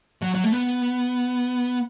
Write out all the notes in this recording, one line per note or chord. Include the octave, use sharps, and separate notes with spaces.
F#3
F#3
A3
B3